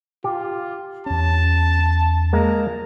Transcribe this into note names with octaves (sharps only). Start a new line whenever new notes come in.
F4 G4
E2 C#4 A5
G#3 A#3 A#5